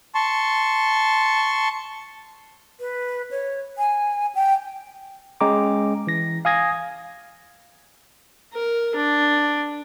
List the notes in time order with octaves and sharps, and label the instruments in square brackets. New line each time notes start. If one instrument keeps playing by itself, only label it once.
[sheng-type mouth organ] A5 C6 C#6
[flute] B4
C#5
G#5
G5
[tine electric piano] G#3 C#4 G5 A#5 D6
E3 A#6
F5 G#5 D#6 G#6 A#6
[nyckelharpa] A#4
D4